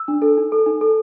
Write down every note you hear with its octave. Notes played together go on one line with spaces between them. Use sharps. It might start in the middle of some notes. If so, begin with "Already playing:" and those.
Already playing: E6
D4
A4
D#4
A4
D#4
A4